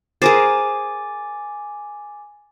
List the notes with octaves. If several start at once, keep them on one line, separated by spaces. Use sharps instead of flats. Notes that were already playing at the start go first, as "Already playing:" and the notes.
G#4 A#4 C5 G#5 D6 A6